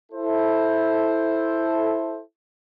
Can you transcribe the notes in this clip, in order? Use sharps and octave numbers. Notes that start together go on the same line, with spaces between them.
E4 A4 C5